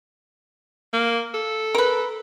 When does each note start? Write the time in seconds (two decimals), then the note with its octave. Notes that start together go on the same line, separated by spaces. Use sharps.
0.93 A#3
1.34 A4
1.75 A#4 B4